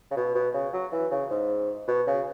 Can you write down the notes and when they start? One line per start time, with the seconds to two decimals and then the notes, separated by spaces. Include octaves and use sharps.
0.11 C#3
0.16 B2
0.35 B2
0.54 C#3
0.73 F#3
0.92 E3
1.11 C#3
1.30 G#2
1.88 B2
2.07 C#3